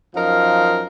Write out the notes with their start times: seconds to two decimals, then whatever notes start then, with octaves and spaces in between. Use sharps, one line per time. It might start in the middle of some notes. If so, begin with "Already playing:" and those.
0.15 F#2 F3 D#4 A#4 F5